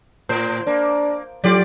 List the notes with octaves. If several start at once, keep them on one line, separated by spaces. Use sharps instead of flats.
A2 C5
A#3 D4
A2 F#3 F4 G4 D5